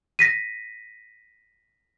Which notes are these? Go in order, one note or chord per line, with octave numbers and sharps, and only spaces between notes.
A#6 B6 D#7